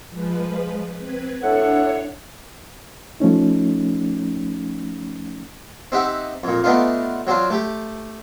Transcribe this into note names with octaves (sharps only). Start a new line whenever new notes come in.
F3 G#3 B4
C4 B4 G#6
A2 D4 A4 C#5 F#5
F3 A3 C#4 D#4
C4 D#4 G4 E5 F#5
F2 A#2
A3 B3 D4 D#4 F4
F#3 C4 D4 F4
A3 G4